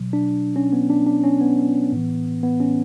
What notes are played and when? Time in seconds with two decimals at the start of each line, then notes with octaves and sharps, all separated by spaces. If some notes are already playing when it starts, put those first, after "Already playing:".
Already playing: B2 F#3
0.13 D4
0.56 C#4
0.73 B3
0.90 D4
1.07 D4
1.23 C#4
1.41 B3
1.92 A2 E3
2.43 B3
2.60 C#4